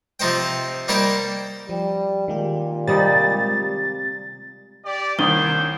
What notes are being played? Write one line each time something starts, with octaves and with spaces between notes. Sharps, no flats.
C3 F3 D#4 C5 G5
G3 A#3 D#4 G4 C5 G5
F3 G3
A#2 D#3 G#3 G4
C3 G3 D#4 A6
G4 D5
C2 D#3 C5 C#5 G5 D#6 G7